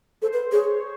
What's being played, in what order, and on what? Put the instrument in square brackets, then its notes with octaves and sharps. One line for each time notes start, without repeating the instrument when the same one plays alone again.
[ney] A4 [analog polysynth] C5
[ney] B4
[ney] G#4 [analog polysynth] C#5